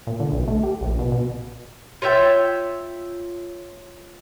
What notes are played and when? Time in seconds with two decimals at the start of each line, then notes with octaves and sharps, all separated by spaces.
0.07 A#2
0.20 D3
0.32 B1
0.48 A3
0.63 G4
0.81 A#1
0.99 B2
1.12 B2
2.02 F4 C#5 E5 G5